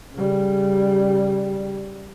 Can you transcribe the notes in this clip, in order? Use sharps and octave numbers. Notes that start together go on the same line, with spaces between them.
C#3 G3